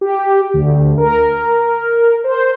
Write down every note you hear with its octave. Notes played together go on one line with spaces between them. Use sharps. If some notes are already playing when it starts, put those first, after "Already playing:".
G4
D2
A#4
C5